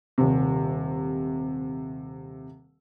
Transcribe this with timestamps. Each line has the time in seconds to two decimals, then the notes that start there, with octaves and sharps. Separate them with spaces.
0.18 D#1 C3